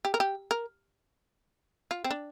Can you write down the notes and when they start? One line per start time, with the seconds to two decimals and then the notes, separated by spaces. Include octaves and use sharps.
0.05 G4
0.14 A#4
0.20 G4
0.51 A#4
1.91 F4
2.04 C4
2.11 D4